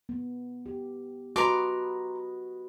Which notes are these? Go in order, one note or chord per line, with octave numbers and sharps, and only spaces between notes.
B3
G4
F#4 B4 D#5 A#5 C6 D6